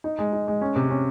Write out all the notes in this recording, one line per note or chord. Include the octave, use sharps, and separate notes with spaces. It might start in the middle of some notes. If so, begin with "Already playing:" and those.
D#4
G#3
D#4
G#3
C#4
C3
C#4